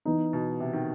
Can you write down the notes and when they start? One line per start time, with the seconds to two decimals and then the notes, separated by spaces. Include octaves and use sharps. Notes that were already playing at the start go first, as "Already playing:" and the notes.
0.05 E3 B3 D#4
0.33 B2
0.60 C3
0.73 D#3